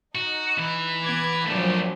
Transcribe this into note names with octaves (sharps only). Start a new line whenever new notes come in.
D#4 F#4
E3 E4
B3 D6 G#6
A#1 F3 F#3 A3 G4